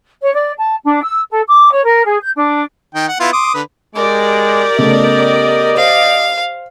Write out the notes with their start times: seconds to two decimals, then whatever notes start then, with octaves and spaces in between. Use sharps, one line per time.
0.22 C#5
0.33 D5
0.58 A5
0.84 D4
1.03 E6
1.31 A4
1.48 D6
1.74 C#5
1.85 A#4
2.05 G#4
2.21 G6
2.36 D4
2.95 D#3 D#4 G5
3.09 F#5
3.20 B3 E4 F4
3.33 C6 D6 D#6
3.54 D3 B4
3.95 G#3 G4 A#4 D5
4.78 C#3 A3 B3 D#5
5.77 C5 F5